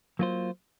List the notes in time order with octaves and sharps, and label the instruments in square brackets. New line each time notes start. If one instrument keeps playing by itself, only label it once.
[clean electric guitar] F#3 A#3 F4 C5